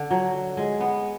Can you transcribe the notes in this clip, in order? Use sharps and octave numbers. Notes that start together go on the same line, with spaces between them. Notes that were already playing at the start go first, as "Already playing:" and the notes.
Already playing: D3
F#3
G#3
B3